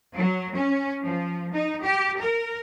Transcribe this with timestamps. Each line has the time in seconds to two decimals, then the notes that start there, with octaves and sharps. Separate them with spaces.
0.15 F#3
0.54 C#4
1.05 F3
1.53 D#4
1.83 G4
2.21 A#4